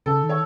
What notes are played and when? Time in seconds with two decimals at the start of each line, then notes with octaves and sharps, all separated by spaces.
0.06 C#3 A4
0.22 D#3
0.29 C#5